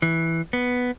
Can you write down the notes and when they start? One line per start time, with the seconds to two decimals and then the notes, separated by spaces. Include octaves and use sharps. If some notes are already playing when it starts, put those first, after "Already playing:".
0.02 E3
0.53 B3